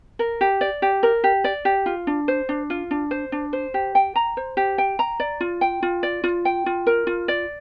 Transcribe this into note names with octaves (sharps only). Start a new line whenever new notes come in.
A#4
G4
D5
G4
A#4
G4
D5
G4
F4
D4
C5
D4
F4
D4
C5
D4
C5
G4
G5
A#5
C5
G4
G5
A#5
D5
F4
G5
F4
D5
F4
G5
F4
A#4
F4
D5